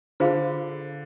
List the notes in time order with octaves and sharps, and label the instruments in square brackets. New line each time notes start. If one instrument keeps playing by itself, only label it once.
[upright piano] D3 [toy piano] F4 G#4 C5 F5